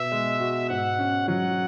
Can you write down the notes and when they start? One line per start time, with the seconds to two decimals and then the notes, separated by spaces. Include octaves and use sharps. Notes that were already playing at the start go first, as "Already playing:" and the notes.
Already playing: B2 B3 E5
0.12 G#3
0.40 F#4
0.69 G#2 F#5
0.99 C#4
1.28 F#3 F#5